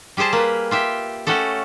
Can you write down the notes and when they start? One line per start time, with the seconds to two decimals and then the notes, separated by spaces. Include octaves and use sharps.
0.17 G3 G4 G#4 C5 A5
0.33 A#3 B4
0.71 F4 G4 E5
1.27 A3 C#4 F#4 G4 A4